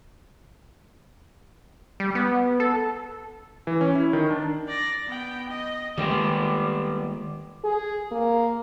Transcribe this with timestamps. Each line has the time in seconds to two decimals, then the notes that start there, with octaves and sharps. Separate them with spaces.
2.00 G3
2.15 B3
2.60 A4
3.67 E3
3.81 C#4
3.95 E4
4.13 D#3
4.30 D4
4.68 D5 A#6
5.07 B3 G5
5.49 D#5
5.98 D#3 G3 G#3 A#3 B3 G4
7.64 G#4
8.12 A#3